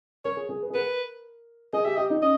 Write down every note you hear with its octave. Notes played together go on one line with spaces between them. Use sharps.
A#4 C#5
G#4
G#4
B4
G#4
A#4 B4
G#4 D#5
G4 E5
G4 D#5
D#4
C#4 D#5